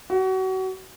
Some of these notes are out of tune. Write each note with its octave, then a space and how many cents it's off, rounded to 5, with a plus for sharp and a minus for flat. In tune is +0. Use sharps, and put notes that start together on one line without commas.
F#4 +30